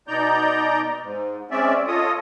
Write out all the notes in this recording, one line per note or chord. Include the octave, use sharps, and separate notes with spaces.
B2 D#4 D5 A#5 G6
G#2
G#3 C4 C#4 D5 E5
F4 A4 C#5 D#5 D#6